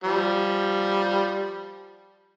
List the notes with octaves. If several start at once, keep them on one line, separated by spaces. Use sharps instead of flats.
F3 G3